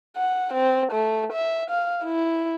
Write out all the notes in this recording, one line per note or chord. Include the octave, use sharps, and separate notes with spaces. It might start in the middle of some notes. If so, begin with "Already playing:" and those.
F#5
C4
A3
E5
F5
E4